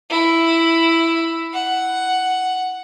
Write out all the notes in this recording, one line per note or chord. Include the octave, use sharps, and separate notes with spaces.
E4
F#5